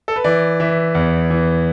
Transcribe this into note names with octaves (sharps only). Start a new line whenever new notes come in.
A4
B4
E3 D5
E3 E5
E2
E3